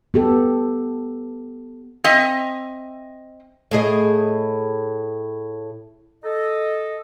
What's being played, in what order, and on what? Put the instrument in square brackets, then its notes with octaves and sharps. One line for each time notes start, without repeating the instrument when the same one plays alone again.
[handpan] B3 G4 A4
[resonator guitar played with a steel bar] C4 D#5 E5
[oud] A2 G#4 D#5
[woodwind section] A4 D#5